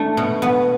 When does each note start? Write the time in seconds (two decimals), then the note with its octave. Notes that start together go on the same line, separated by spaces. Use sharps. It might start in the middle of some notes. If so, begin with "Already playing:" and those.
Already playing: A3 D4
0.17 B2
0.42 B3